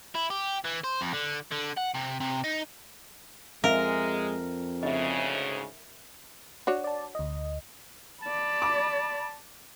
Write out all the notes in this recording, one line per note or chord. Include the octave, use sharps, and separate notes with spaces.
E4
G4
E3
C5
F2
D3
D3
F#5
C3
C3
D#4
F2 G#3 A#4 E5 F5
D2 G#2 C#3 D#5 E5
D4 F#4 C#5
D5 A5
D2 D#5
D5 A5 B5
D6